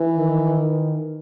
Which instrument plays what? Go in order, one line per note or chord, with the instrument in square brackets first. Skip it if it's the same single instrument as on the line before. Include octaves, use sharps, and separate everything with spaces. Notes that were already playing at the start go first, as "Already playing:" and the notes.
Already playing: [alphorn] E3
[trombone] D#3